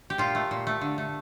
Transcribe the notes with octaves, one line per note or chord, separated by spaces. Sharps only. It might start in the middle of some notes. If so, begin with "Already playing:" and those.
G4
A#2 F4
A3
A#2
A3
D3
A3